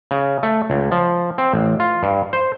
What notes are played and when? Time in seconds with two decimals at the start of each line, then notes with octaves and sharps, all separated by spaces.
0.11 C#3
0.43 A3
0.70 C#2
0.91 F3
1.38 C4
1.53 A1
1.80 F4
2.03 G2
2.33 C5